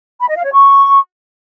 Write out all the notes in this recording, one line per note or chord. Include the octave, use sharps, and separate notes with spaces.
B5
D#5
F5
C#5
C#6